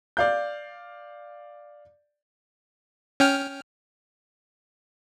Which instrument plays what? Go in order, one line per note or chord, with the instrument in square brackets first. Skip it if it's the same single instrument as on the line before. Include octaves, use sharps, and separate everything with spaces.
[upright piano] D5 F5 G6
[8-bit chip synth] C#4 G5 F6